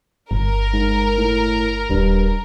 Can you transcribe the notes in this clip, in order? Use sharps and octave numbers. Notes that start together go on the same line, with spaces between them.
G1 A#4
G#2
A2
D#1 G2